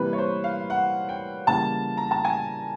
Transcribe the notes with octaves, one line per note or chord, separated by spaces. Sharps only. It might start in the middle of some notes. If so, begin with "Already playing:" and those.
Already playing: C3 E3 G3 A#3 B4
C#5
C5
F5
F#5
G5
C#3 E3 G3 A#3 A5
A#5
A5
G#5